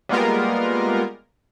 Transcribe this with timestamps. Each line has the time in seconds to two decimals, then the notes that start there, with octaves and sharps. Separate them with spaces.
0.09 G3 G#3 A#3 B3 F4 A#4